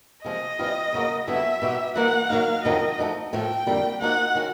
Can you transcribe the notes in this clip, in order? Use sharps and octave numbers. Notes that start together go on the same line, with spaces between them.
C3 F3 G#3 C4 D#5
C3 E3 G3 C4 F4
E2 C#3 F#3 A#3
F#2 D3 G3 B3 E4 E5
B2 G3 B3 D#4 G4
E3 G3 A#3 D#4 F#5
D#3 F#3 A#3 D#4 F5
F2 C3 D#3 F#3 D#5
F3 A3 C4 D#4 F#4
A2 F3 A3 G5
F2 D3 G3 A#3
F3 A#3 D#4 F#4 F#5
D#3 G#3 C#4 F#4